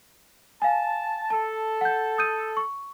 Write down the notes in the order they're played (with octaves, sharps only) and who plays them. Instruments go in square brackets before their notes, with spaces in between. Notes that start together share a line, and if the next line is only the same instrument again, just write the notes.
[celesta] F5 G#5 [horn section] A5
[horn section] A4 [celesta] A5
[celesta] F#5 G6
D#6 G6 D#7
C#6